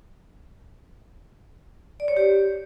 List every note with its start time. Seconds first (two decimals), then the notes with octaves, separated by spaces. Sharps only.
2.00 D5
2.08 C#5
2.17 G4